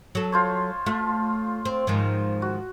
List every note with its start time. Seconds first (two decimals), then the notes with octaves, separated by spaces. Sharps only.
0.15 F#3 A4
0.32 F4 C5 C#5
0.86 A3 F4
1.65 C4
1.87 G#2 D#3 F3
2.42 F#4